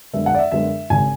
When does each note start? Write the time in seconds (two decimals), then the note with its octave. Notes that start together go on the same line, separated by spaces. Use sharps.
0.13 F#2 D3 G#3 B3 E5
0.26 F#5
0.35 D5
0.39 E5
0.52 F#2 D3 G#3 B3 E5
0.90 G#1 C#3 G#5